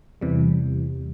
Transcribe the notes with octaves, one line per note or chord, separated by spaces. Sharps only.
E2 C3 E3 G3